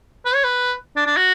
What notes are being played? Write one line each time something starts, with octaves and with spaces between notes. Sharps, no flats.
B4
C#5
B4
D4
D4
F#4